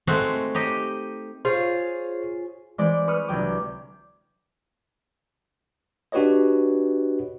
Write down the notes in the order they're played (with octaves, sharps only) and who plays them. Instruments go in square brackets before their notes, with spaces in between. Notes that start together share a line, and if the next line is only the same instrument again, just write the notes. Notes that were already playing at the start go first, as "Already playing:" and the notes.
[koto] G#3 A3 C4 D#4 F#4
D#4 G4 D#5
[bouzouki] F4 G#4 C#5 [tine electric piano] C5
[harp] E3 G#3 C4 D5
B4 C#6 D#6 F6
C2 D3 F#3 G5 D6
[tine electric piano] D4 F#4 G4 B4 C#5 D#5